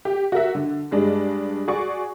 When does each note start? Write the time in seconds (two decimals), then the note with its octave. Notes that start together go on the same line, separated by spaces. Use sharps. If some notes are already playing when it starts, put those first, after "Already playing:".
0.05 G4
0.32 F#4 A#4 E5
0.55 D3
0.91 G2 G#3 D4
1.68 F#4 G#4 D5 C#6